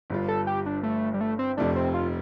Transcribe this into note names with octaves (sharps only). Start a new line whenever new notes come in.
G1 G2 G3 F4
A4
G4
D4
A3
G3
A3
C4
F1 F2 C3 A3 D4
C4
F4